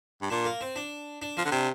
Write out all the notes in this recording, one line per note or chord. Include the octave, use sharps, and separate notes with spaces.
G2
A#2 D4
A#3
C4
D4
D4
F3 C4
D3
C3 D4